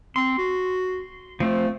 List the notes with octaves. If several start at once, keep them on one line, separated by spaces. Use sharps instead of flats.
C4 C6
F#4
F3 A3 C4